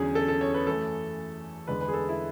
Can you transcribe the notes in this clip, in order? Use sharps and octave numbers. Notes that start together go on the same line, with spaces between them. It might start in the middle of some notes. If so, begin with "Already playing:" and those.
Already playing: E2 D3 F#3 C#4 G#4
A4
A4
C#5
B4
F#2 E3 A3 A4
E2 D3 G#3 B4
B4
G#4
A4
E4